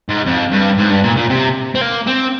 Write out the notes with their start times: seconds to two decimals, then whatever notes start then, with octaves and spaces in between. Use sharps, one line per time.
0.09 G#2
0.26 F2
0.52 G2
0.78 G#2
0.90 G2
1.04 A#2
1.16 A#2
1.29 C3
1.75 C4
1.81 A#3
2.07 C4